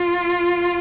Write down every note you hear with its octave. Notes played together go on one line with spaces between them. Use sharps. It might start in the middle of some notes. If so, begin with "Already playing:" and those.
Already playing: F4